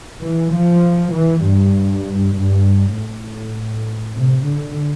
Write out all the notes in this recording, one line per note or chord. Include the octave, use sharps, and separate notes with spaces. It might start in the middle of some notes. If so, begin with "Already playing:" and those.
E3
F3
E3
G2
G2
A2
C3
D3